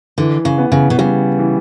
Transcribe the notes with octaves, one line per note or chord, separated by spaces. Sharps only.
D3 E3
C#3
B3
C#3
B2
C#3 G3
E3